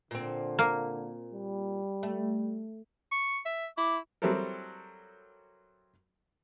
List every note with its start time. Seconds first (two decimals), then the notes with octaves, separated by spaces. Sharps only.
0.11 A#2 D3 C4
0.59 A#3
1.34 G3
2.03 A3
3.11 C#6
3.45 E5
3.78 E4 D6
4.22 F#3 G3 C4 E4 A4 A#4